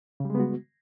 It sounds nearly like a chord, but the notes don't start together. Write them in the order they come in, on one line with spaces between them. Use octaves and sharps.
C#3 G3 G#3 B3 F#4